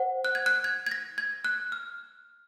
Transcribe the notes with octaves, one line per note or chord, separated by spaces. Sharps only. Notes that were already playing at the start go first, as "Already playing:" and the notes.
Already playing: C5 F#5
F#6
G#6
F#6
G#6
G#6
A#6
G#6
F#6
F6